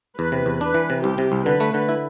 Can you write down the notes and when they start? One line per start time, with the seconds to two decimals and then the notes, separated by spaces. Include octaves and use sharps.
0.18 E2 B4
0.32 C3
0.46 E2
0.61 D4 B4
0.74 E3
0.90 C3
1.04 C2 G4
1.18 C3
1.32 C2
1.46 D3 B4
1.60 A3
1.74 D3
1.89 E4